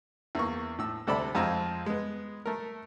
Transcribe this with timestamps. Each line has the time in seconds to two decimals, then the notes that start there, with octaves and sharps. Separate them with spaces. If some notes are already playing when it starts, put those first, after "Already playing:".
0.35 E2 A#3 C#6
0.79 A2 E6
1.07 D2 C3 A4 D5 A5 B5
1.35 F2 G#3 C4 F4 A#5 E6
1.86 G#3 B3
2.46 A3 A#4